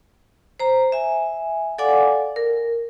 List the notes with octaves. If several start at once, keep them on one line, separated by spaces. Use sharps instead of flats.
C5 A#5
E5 G#5
A4 D5 F5 F#5 G#5 D6
A#4